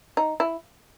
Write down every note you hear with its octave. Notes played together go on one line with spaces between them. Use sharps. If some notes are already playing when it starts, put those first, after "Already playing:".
D#4
E4